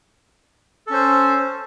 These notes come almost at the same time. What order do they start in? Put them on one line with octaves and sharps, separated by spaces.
A4 C#4 C5